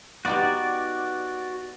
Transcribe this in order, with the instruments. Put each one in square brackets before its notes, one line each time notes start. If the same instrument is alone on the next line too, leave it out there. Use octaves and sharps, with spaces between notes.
[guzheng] B3 D#4 G4 [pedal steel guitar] F#4 D5